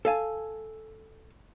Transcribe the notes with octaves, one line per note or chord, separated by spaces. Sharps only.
A4 F5 G#5 A5